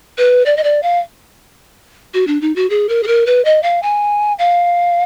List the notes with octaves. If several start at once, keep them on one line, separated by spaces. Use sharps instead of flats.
B4
D5
D#5
D5
F5
F#4
D4
D#4
F#4
G#4
A#4
G#4
A#4
B4
D#5
F5
G#5
F5